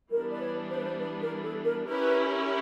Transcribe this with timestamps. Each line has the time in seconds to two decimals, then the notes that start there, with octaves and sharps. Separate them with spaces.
0.11 E3 G3 B3 D4 A#4
0.31 D5
0.41 B4 C#5
0.70 C5
0.77 B4
0.85 C5
0.99 B4
1.22 A#4
1.43 A4
1.65 A#4
1.87 C#4 E4 G4 A#4 B4